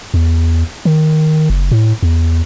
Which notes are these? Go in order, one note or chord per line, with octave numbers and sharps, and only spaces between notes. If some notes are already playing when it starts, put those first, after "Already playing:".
E2
D#3
F#1
A2
E2